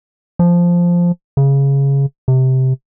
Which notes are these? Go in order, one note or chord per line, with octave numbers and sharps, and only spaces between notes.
F3
C#3
C3